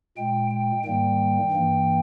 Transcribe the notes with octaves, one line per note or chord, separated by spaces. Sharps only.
A#2 G#3 G5
G5
G#2 D#3 G3 A#3 G5
G2 E3 A#3